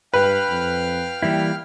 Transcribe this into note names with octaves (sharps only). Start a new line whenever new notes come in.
G2 B4 F5 G5 F6
F2
E3 G3 A#3 E4